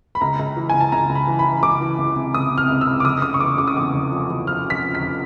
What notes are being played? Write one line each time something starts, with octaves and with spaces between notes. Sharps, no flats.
B5
C#2 A#5
C#2
E3
C#2 G#5
A5
C#2 A#5
C#2
B5
E3
B5
E3
C#2 D6
E3
C#2
C3
C#2 D#6
C3
F6
C#2
E6
C#2
D6
F1 D#6
C#3 D#6
C#6
E2 D6
C#3 D6
D#6
E2 D6
F1
F3
E2
F3 F6
F3
B6
F3
B6
F1